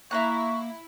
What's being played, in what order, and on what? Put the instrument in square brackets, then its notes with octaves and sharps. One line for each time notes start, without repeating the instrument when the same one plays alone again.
[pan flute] A#3 [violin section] E4 [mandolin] E5 A#5 F#6 [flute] C#6